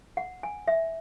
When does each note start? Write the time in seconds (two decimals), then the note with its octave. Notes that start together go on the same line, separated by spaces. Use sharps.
0.17 F#5
0.43 G#5
0.68 E5